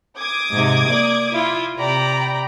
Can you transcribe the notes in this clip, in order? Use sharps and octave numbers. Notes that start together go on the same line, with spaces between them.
D6 D#6 G#6
G#2 C3
A#3 D5
E4 F4
C3 D5 G5 A#5 B5